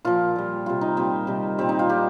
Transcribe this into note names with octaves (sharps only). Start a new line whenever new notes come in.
A#2 F3 F4
A#2 G3
C3 G3 F4
D#4
A#2 G3 C4
C3 D#3 G3
A#2 G3 C4
D#4
F4
A#2 G3 G4